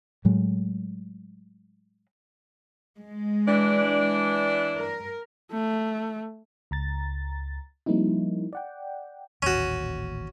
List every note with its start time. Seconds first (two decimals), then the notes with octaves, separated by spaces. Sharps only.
0.25 A2 F#3 G#3
2.98 G#3
3.47 E3 D4
4.77 A#4
5.53 A3
6.71 C#2 A#5 A6
7.86 F3 G3 A#3 C4 D#4 E4
8.53 D5 F#5 G5
9.42 D#1 A1 D#2 C#4 F#4